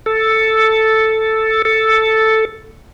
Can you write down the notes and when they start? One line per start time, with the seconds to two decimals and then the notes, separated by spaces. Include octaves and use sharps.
0.06 A4
1.65 A4